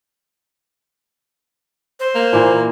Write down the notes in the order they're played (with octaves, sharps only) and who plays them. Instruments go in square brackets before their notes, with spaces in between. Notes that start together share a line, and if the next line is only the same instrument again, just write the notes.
[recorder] C5
[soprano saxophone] A#3
[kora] A#2 E3